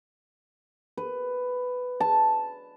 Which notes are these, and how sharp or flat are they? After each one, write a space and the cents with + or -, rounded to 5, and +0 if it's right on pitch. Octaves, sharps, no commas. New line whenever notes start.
B4 +10
A5 -5